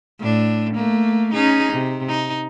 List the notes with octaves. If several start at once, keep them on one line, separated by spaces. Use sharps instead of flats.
A2 D4
A3 A#3
C#4 D#4 G#4
C3
D#4